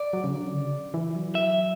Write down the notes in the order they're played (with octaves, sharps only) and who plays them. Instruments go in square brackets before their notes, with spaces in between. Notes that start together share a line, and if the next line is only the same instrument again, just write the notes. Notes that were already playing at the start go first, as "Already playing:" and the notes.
Already playing: [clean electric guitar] D5
[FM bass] F#3
C#3
D3
C#3
E3
F#3
[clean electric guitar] E5